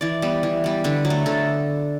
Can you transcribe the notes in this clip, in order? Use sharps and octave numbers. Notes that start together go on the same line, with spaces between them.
E3 D5
G3 B3
E3
G3 B3
D3 B4
F#3
A3
D3 A4